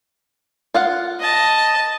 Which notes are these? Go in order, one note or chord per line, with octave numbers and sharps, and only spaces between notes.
F4 F5 F#5
D#5 A5